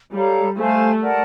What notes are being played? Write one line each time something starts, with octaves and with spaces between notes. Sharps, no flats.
G3 A4 C#5 F5 A#5
A3 C5 F5 G#5 C6
A#4 D5 F#5 A5